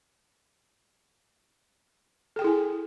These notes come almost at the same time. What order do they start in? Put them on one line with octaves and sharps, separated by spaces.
A4 G5 G#4 E4 G#5